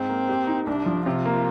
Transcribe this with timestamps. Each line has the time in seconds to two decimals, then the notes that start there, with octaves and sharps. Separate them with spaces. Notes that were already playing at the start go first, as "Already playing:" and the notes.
Already playing: G#2 C4
0.09 A#3
0.29 G4
0.47 D#4
0.67 C2 D4
0.86 F3
1.06 C3 F4
1.25 A#3